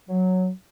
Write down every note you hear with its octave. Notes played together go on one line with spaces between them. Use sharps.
F#3